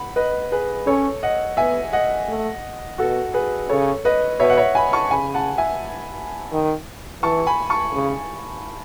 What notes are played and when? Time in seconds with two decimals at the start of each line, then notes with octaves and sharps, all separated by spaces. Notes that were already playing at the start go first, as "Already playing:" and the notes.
Already playing: F#5 B5
0.16 B4 D#5
0.52 G#4 B4
0.87 C#4 A4 C#5
1.23 D#5 F#5
1.57 B3 E5 G#5
1.93 D#5 F#5
2.28 A3
2.98 B2 F#4 A4
3.34 G#4 B4
3.70 C#3 A4 C#5
4.05 B4 D#5
4.40 B2 C#5 E5
4.49 F#5
4.57 C#5 E5
4.75 G#5 B5
4.93 A5 C#6
5.11 C#3 G#5 B5
5.34 F#5 A5
5.58 E5 G#5
6.53 D#3
7.22 E3 A5 C#6
7.47 G#5 B5
7.69 A5 C#6
7.93 C#3